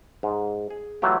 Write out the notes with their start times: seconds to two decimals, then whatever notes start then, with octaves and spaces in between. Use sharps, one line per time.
0.23 G#2
0.70 G#4
1.02 E3 F#3 A3 F4 G4